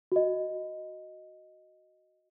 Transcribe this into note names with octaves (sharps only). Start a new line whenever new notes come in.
F#4 D#5